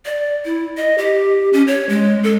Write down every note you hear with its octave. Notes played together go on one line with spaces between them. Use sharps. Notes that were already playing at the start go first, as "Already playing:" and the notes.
D5
E4
D#5
G4
C#4
C#5
G#3
A4